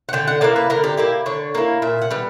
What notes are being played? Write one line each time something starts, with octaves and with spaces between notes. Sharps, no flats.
F#5
D3 G5
F#5
A#3 E4 D5
B4
D3 A#4
G4
A#3 E4 G4
D3 C#5
A#3 E4
A#2 E5
F#5
G3 B3